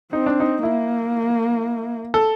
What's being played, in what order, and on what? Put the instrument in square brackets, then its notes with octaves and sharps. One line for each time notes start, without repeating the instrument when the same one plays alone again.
[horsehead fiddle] C4 [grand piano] D#4
[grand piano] D4
D#4
[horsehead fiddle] A#3 [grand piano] E4
[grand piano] A4